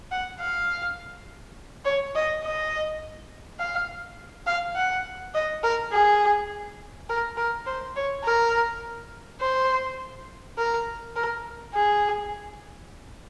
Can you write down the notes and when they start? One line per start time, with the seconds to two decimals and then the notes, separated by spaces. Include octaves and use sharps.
0.11 F#5
0.40 F5
1.85 C#5
2.15 D#5
2.43 D#5
3.59 F5
4.46 F5
4.76 F#5
5.34 D#5
5.63 A#4
5.92 G#4
7.09 A#4
7.37 A#4
7.66 C5
7.96 C#5
8.24 A#4
9.40 C5
10.58 A#4
11.16 A#4
11.74 G#4